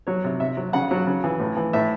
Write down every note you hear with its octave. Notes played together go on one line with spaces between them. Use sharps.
F#3 C#5
C3
C3 E5
F#3
C#3 F#5
F#3
C#3
E3
A2
E3
A2 E5